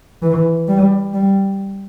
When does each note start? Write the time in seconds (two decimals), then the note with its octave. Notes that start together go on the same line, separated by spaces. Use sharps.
0.22 E3
0.68 G3
1.14 G3